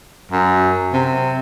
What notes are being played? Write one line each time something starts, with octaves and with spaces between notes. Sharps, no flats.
F#2
C3